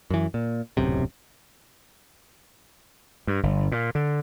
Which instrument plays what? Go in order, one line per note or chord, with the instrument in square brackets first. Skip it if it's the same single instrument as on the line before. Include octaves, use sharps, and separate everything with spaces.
[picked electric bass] F#2 E3
A#2
D1 B1 F#2 C3
[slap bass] G2
G1
A#2
D3